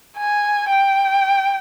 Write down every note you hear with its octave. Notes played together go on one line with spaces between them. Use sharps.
G#5
G5